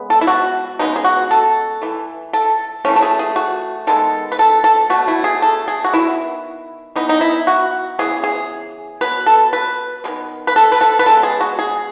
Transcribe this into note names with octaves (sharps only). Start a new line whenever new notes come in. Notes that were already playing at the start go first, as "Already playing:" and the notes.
Already playing: C#3 G#3 B3
A4
E4
F#4
C#3 G#3 B3 D#4
G#4
F#4
A4
E3 A3
A4
E3 A3 C#4
A4
G#4
G#4
F#4
D#3 G#3 B3 A4
B4
A4
A4
B2 F#3 A3 F#4
E4
G#4
A4
G#4
F#4
D#3 G#3 B3 E4
E3 B3 D#4
D#4
E4
F#4
C#3 E3 B3 G#4
G#4
B2 F#3 B3 B4
A4
B4
D#3 G#3 B3
B4
A4
B4
A4
B4
C#3 G#3 B3 A4
G#4
F#4
G#4